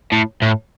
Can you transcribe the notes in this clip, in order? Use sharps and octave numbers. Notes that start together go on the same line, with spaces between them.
A2
A2